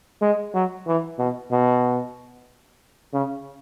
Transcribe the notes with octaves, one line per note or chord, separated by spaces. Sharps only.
G#3
F#3
E3
B2
B2
C#3